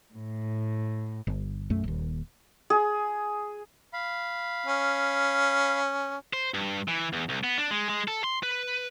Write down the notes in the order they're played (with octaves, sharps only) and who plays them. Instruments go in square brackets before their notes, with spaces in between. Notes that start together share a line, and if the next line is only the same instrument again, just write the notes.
[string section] A2
[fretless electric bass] G1
B1 F#2 A3
D#1 D#2
[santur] G#4
[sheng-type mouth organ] F5 B5
[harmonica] C#4
[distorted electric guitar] C5
G2
E3
E2
C2
B3
D4
G#3
G#3
A4
C6
B4